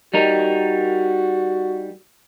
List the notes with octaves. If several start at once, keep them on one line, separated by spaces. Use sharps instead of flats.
G3 D#4 F#4 A#4